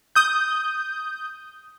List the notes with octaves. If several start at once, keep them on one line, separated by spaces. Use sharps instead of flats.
D#6 G6